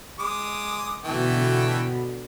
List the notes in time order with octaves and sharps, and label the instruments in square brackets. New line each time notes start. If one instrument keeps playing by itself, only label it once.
[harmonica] G#3 D6 D#6
[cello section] B2 D3 [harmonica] E3 A3 G5